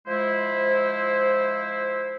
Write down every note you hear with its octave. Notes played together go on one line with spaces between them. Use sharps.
F3 G#3 E4 C5